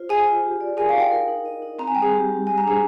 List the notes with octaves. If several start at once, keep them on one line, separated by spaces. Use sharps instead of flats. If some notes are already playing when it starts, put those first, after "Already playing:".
Already playing: F4 C5
G#4 D#5 G#5
F4
G4
D5
G#4 A#4 G#5
F5
D#4
G5
A#4
D#4
D#5
D#4
C4 A#5
G#5
G3 G5
G#4 G#5
G4
G3
G4 G#5
A#5
D4 G#4 G#5